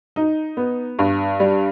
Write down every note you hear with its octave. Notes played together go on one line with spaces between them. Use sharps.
D#4
B3
G2
G3